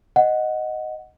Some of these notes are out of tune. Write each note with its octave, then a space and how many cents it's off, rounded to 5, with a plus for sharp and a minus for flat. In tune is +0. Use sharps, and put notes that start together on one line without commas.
D#5 +0 F#5 +0